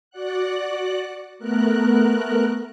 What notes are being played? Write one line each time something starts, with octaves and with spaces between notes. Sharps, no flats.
F#4 D5 F#5 F#6
A3 B3 A#4 F#6